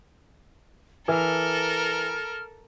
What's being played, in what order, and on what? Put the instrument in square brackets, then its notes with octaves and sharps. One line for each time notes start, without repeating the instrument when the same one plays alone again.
[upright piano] E3 [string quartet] A4 A#4 [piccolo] F6